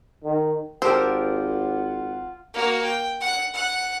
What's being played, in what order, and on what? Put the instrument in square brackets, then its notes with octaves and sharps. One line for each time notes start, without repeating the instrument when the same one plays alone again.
[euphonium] D#3
[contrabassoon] G#1 [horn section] F4 F#5 [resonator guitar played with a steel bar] G4 A#4 G5 [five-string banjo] A4 C5
[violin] A#3 F#4
G5
F#5 F#6
F#5 F#6